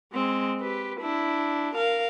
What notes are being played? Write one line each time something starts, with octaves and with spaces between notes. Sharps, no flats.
G#3 C4
G4 B4
D4 E4
A#4 F5